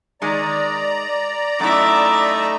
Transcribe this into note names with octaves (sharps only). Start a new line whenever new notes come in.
D#3 G#3 D5 A#5
F#2 A3 D#4 E4 E5 D6